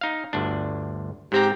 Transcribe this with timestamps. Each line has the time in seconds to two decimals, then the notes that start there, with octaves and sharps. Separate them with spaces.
0.01 D#4 F5
0.33 G1 D2 D4
1.32 G#2 C4 G4 A#5